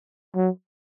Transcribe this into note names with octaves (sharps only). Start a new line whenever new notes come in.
F#3